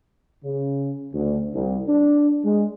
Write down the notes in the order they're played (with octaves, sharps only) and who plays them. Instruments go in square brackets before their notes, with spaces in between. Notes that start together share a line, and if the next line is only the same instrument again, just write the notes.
[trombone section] C#3
D2
C2
D4
G#3